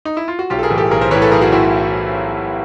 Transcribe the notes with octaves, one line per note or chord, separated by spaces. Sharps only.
D#4
E4
F4
F#4
B1 F4 G4
A4
G#4 A#4
A2 E3
G4 A4
B1 G#4 A#4
A#4 C5
A2 E3 B4 C#5
A4 B4
B1 G#4 A#4
F#4 G#4
A2 E4 F#4